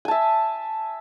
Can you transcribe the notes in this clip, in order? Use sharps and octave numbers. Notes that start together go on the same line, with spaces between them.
E5 G#5 A5